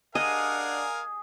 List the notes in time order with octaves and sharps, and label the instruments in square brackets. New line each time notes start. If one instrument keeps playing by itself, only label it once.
[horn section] D4 D5 F#5 [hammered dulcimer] G#4 [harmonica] A#4 F5 G#5 [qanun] D#5